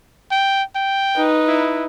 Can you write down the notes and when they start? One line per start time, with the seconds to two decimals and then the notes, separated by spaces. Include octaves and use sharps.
0.31 G5
0.75 G5
1.16 D#4 B4
1.48 E4